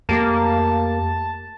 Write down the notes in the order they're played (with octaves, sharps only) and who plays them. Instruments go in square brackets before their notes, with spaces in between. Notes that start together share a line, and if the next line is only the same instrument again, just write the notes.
[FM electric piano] F2 [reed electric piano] A3 G4 D6 [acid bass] A#3 [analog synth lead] A5